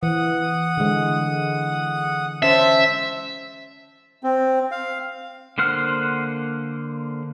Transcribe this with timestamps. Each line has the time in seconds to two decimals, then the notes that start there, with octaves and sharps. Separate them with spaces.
0.03 E3 F#5 D#6
0.77 D3 G#3
2.43 C#4 C5 E5 A5
4.24 C4
4.72 F5
5.58 D3 A#3 C5 F#5 F6